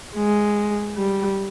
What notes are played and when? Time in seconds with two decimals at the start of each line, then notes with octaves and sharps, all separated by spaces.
0.16 G#3
0.97 G3